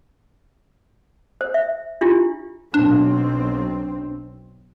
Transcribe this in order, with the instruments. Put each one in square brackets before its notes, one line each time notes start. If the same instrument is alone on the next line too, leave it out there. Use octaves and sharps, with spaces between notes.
[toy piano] C5
E5
D4 E4 F4 G4
[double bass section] B1 C4 [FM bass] D4